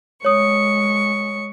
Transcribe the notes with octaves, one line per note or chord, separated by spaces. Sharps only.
G#3 C#5 C#6 D#6